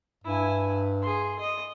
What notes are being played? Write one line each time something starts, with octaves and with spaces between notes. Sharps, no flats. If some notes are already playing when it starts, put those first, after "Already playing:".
G2 E4 G#5
G#4 C6
D#5